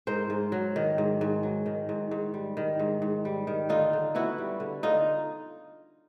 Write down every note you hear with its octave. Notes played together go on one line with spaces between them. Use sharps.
G#2 A#4 C5
G#2
F#3
D#3
G#2
G#2
F#3
D#3
G#2
G#2
G3
D#3
G#2
G#2
G3
D#3
D3 D#4 F4
D3
B3 E4 F#4
G3
D3
D3 D#4 F4